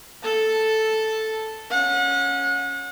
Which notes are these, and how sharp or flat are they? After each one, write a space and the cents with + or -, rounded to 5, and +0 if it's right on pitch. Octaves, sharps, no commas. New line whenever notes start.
A4 +0 A5 -5
C#4 +0 F#5 -35